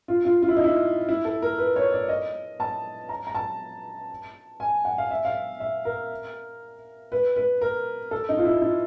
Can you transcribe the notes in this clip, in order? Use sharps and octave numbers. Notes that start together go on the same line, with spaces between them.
F4
F4
F4
E4
D#4
E4
E4
A4
A#4
B4
C#5
D5
D#5
A5
A#5
A#5
A5
G#5
F#5
F5
E5
F5
E5
A#4
B4
B4
A#4
A4
D#4
F4
E4
E4